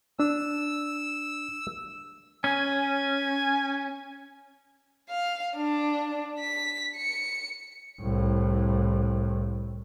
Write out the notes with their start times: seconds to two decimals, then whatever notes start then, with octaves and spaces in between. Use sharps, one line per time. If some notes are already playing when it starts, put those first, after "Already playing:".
0.20 D4 E6
2.44 C#4 G#5
5.10 F5
5.56 D4
6.40 B6
6.97 C#7
8.00 C2 A2